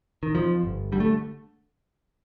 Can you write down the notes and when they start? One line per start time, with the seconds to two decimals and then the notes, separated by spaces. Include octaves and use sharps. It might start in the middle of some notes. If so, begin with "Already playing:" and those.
0.23 D#3
0.35 F2 F3
0.63 G1
0.92 D3 G3
1.00 A3